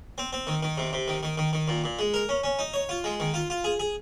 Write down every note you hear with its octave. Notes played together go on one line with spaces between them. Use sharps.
C4
C4
D#3
D#3
C3
C3
D#3
D#3
D#3
D#3
A#2
A#2
G#3
A#4
C#4
C#4
D#4
C#5
F4
G#3
D#3
F4
F4
G#4
G#4